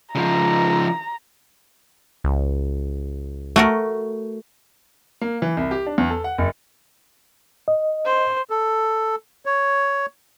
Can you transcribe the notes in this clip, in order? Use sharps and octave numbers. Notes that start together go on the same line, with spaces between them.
C#3 F3 A#5
C#2
A3 F#4 A#4
A#3
E3
C2
G4
D4
E2
A4
F#5
F#1
D#5
C5
A4
C#5